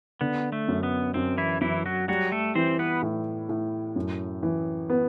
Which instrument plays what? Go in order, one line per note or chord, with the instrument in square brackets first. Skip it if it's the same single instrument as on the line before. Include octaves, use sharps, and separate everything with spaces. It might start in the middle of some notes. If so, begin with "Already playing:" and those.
[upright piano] D3 [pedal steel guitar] B3
[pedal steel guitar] A3
[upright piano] F#2
[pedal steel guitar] B3
[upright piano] F#2 [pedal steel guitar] C4
[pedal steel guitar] E3 E4
[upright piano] F#2 [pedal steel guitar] E3 E4
[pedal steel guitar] F#3 F#4
[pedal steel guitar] F#3 F#4 [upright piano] G3
[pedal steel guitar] A3 A4
[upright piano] E3 [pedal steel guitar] C4 C5
[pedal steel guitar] B3 B4
[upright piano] A2
A2
F#2
E3
B3